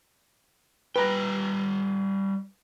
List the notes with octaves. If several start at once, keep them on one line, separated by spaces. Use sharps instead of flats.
G3 F4 B4 G5 A#5